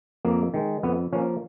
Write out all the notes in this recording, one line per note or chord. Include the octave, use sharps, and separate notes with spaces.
F2 A#3
D#3 G#3
F2 B3
F3 A#3 C#4